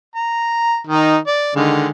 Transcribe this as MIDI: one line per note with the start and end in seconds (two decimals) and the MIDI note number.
0.15 0.80 82
0.87 1.17 51
0.87 1.17 63
1.27 1.52 74
1.55 1.88 50
1.55 1.88 51
1.55 1.88 56